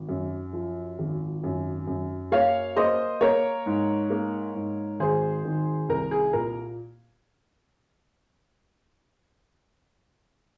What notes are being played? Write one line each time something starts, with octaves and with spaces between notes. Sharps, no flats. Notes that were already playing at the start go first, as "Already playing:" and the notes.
Already playing: G#1
F#2
F3
G#1
F#2
F#2
A#3 C#5 F5
A#3 C5 D#5
A#3 A#4 C#5
G#2
A#3
G#2
G#1 G#4 C5
D#3
C2 A#4
G#4
A#2 A#4